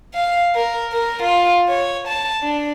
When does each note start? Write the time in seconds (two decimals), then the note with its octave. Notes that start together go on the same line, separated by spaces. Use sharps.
0.14 F5
0.55 A#4
0.92 A#4
1.23 F4
1.68 C#5
2.08 A5
2.42 D4